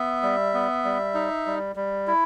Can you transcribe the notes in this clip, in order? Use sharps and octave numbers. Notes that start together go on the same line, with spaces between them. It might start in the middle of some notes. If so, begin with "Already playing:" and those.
Already playing: B3 E5
G3
B3
G3
D#4
G3
G3
E4